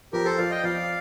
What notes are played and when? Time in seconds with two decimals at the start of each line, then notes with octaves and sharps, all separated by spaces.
0.13 F2 G4 A#4
0.25 A4 C5
0.38 F3 D5 F5
0.50 D#5 G5
0.63 F2 D5 F5